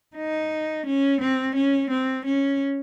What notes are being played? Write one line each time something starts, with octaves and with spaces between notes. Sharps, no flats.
D#4
C#4
C4
C#4
C4
C#4